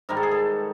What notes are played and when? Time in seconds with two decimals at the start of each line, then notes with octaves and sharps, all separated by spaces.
0.09 G#2 D#3 G3 A#4
0.17 A4
0.23 G#4
0.31 A4